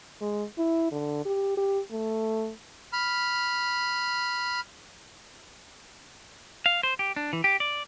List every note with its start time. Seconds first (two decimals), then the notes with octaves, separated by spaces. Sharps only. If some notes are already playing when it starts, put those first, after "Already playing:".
0.21 G#3
0.58 E4
0.92 D3
1.25 G4
1.57 G4
1.91 A3
2.93 B5 F6
6.66 F5
6.83 C5
6.99 G4
7.16 D4
7.33 E3
7.44 G4
7.60 D5